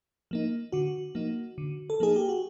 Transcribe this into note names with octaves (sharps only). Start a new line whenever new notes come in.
F3 A#3 D#4
D3 F#4
F3 A#3 D#4
D3
A4
F3 A#3 D#4 G#4
G4
F#4